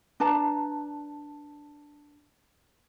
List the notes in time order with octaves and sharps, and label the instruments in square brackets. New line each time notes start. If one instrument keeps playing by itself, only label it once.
[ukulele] D4 B4 A5 A#5